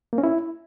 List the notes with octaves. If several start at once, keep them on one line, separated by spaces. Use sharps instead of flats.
A#3
C#4
E4